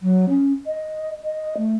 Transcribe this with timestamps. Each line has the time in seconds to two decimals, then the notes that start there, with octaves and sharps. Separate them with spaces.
0.02 F#3
0.29 C#4
0.67 D#5
1.24 D#5
1.57 A3